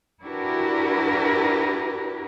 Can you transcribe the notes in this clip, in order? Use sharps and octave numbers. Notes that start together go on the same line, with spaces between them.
D4 E4 F#4 G4 A#4 B4